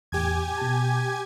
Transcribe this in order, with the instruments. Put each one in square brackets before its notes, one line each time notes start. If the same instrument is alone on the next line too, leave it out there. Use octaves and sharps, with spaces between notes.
[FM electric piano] E2 A2 [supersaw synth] G4 G#5 G#6
[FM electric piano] B2 A5